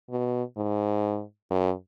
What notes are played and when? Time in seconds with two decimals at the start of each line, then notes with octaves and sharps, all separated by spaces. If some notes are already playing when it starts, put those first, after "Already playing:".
0.10 B2
0.57 G#2
1.50 F#2